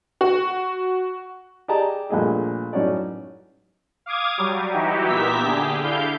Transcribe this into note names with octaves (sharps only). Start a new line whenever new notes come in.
F#4
G4 G#4 D5 D#5 A5 A#5
A#1 G3 A3 G#4 D#5
A1 F#2 C#4 D#4 C#5 D5
F5 D6 D#6 G#6
F#3 G3
E3 D#4 E4 F#4 G4
A#2 B3 G4 E5 A#5 B6
D3 G4 G#4
D3 E4 F5 G6